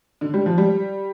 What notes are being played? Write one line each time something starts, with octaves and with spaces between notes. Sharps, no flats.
D3
G3
F3
G3